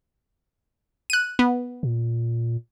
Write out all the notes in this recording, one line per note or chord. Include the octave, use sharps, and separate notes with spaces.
F#6 D#7
B3
A#2